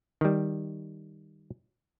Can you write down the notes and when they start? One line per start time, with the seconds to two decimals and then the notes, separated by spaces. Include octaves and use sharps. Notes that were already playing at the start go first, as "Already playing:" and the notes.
0.21 D#3 G3